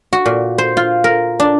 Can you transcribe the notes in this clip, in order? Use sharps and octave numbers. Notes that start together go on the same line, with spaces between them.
F#4
A#2
C5
F4
A#4
D4